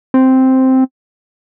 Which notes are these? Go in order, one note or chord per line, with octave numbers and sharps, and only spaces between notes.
C4